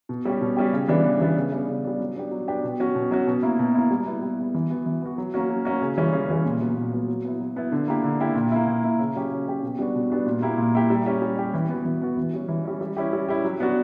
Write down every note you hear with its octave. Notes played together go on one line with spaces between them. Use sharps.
B2
G3 C#4 G4
B2
G3 C#4 G4
C#3
E3 G3 B3 D4
C#3
E3 G3 B3 D4
C#3
G3 B3 D4
C#3
G3 B3 D4
F#3
B3 D4 G4
F#3
B3 D4 G4
B2
F#3 C#4 F#4
B2
F#3 C#4 F#4
B2
A#3 E4
B2
A#3 E4
G3
B3 E4
G3
B3 E4
E3
B3 F#4
E3
B3 F#4
F#3
A#3 C#4 F#4
F#3
A#3 C#4 F#4
C#3
E3 G3 C#4
C#3
E3 G3 C#4
A#2
F#3 B3
A#2
F#3 B3
F#3
B3 E4
F#3
B3 E4
D3
A#3 E4 G4
D3
A#3 E4 G4
A#2
A#3 E4
A#2
A#3 E4
C#3
F#3 C#4 G4
C#3
F#3 C#4 G4
B2
G3 B3 D4 F#4
B2
G3 B3 D4 F#4
A#2
A#3 E4 G4
A#2
A#3 E4 G4
G3
C#4 G4
G3
C#4 G4
E3
B3 F#4
E3
B3 F#4
E3
G3 C#4
E3
G3 C#4
G3
C#4 E4 G4
G3
C#4 E4 G4
F#3
B3 D4 F#4